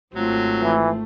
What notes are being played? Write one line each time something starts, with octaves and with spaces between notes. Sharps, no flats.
G#1 F#3 A3 C4 F4
E3